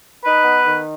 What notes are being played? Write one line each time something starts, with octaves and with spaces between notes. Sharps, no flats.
D#4 B4
B3
D#3